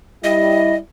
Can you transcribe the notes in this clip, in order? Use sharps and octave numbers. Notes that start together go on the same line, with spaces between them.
G3 E4 D#5